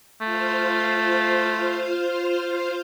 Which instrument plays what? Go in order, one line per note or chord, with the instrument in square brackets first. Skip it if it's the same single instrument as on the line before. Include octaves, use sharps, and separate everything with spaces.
[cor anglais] A3 [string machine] F4 C5 F5